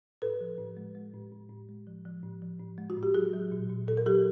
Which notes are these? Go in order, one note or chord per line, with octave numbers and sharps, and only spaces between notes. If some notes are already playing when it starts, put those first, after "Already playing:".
A2 A4 B4
F3
A2
G#3
G#3
A2
A2
A2
G#3
F3
F3
A2
F3
A2
G#3
F#4
A2
G4
F#3 F#4 G#4
F#3
A#2
A#2
A#2 A4
A#4
F#3 G4 A4